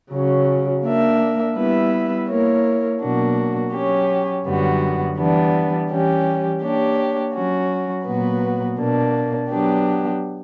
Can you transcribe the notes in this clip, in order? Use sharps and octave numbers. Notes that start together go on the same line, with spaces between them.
C#3 F#3 C#4
A#3 D4 A#4 E5
G3 B3 E4 B4 E5
A#3 E4 A#4 C#5
B2 F#3 A#3 D4 F#4
F#3 C#4 G4 C#5
F#2 D3 G3 B3 F#4
E3 G3 B3 D4
E3 G3 C#4 G4
A#3 D4 G4 C#5
F#3 C#4 F#4
A#2 F#3 B3 F#4 B4
B2 A#3 D4
F#3 B3 D4 G4